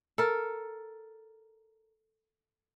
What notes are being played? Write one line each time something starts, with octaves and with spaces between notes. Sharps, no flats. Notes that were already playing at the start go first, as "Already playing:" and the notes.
A4 A#4